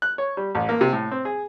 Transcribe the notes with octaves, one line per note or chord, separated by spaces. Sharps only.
F#6
C#5
G3
A1
A#3
C3
A2
C4
G#4